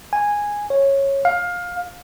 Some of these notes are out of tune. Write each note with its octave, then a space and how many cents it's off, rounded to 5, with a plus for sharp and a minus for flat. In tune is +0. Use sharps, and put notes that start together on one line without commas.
G#5 -10
C#5 -10
F5 +20